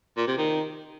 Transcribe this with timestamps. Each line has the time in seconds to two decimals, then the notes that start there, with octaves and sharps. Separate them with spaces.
0.17 A#2
0.27 C3
0.38 D#3